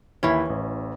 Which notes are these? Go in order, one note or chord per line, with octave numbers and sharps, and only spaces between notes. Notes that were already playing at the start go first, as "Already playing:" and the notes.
D#2 E3 C#4 E4 B5
A1